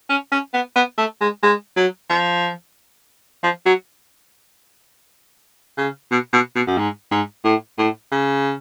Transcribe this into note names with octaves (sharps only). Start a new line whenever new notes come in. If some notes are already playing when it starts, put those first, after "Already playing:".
C#4
C#4
B3
B3
A3
G#3
G#3
F#3
F3
F3
F#3
C#3
B2
B2
B2
F#2
G#2
G#2
A2
A2
C#3